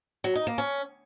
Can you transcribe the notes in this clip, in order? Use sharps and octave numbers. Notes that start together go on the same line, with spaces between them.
F#3
D#4
A#3
C#4